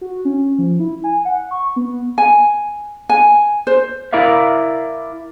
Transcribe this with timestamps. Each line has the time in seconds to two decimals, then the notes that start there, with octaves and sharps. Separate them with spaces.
0.01 F#4
0.25 C#4
0.59 F3
0.80 E4
1.04 G#5
1.25 F#5
1.51 C#6
1.76 B3
2.18 G#5
3.09 G#5
3.67 C5
4.13 E4 A#4 D5 E5 F5